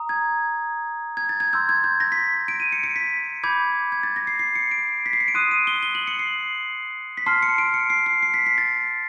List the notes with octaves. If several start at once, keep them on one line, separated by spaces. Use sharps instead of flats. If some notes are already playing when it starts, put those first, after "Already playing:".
Already playing: A#5 D#6
G#6
G#6
A6
G#6
C6 E6 G6
G#6
G6
A#6
B6
D7
D#7
C#7
C#7
B6
B5 D6 G6 G#6
G#6
A6
A#6
C7
C7
C#7
D7
B6
C7
C#7
D7
C6 D#6 F#6 D#7
D#7
G7
G7
F#7
C#7
C7
B6
A5 C6 F6 C7
C#7
D7
C#7
C7
C7
C7
B6
B6
A6